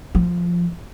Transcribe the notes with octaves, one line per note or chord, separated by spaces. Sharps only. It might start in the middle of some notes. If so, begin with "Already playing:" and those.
F3